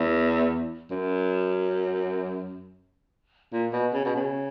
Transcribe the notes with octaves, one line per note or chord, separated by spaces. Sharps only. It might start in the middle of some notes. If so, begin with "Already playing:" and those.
Already playing: E2
F#2
A#2
B2
C#3
B2
C#3